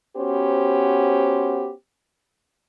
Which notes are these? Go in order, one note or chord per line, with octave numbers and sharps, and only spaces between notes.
B3 C#4 F#4 G4 C5